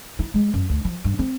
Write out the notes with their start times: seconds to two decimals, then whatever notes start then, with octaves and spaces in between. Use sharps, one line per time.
0.19 E4
0.34 G#3
0.54 F#2
0.69 D2
0.85 F3
1.04 G2
1.19 C4